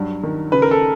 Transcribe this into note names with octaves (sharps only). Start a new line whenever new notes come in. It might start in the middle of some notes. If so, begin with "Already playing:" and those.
Already playing: G2 F#3
D#3
C#3 B4
A#4
A4